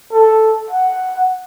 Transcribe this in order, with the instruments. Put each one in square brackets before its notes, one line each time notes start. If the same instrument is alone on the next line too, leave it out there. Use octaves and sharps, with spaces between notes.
[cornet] A4
F#5